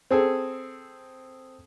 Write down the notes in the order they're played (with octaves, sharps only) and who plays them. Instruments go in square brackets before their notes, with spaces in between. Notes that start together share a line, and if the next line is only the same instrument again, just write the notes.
[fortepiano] C4 G#4 A4